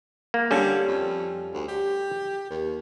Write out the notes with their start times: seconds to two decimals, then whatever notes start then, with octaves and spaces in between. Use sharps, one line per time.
0.34 A#3
0.51 D3 G3 C#4 A4
0.88 F2
1.54 D2
1.68 G4
2.50 D#2